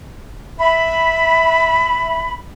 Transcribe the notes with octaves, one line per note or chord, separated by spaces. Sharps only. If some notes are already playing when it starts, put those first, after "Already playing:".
E5 B5